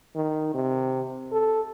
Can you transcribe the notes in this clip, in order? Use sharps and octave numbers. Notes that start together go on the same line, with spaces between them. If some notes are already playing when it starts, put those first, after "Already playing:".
D#3
C3
A4